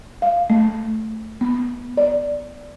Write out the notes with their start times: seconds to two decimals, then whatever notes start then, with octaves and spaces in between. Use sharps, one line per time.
0.22 F5
0.50 A3
1.41 B3
1.97 D5